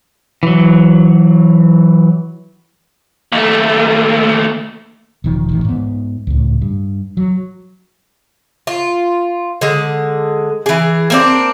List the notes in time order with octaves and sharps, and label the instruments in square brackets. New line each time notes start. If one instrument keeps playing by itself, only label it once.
[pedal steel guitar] E3 F#3
[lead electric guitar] D#2 A3
[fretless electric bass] E1 D#3 F3
A1 D#3
G#2 B3
C#2 A2
G2
F#3
[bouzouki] F4
D3 G#3
E3 G#4
A#3 C4 D4